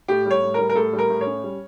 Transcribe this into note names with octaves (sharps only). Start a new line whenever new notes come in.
A2 G4
G3 C#5
A2
G3 A#4
A#4
A2 A4
G3
A#4
A2
C#5
C#4
G3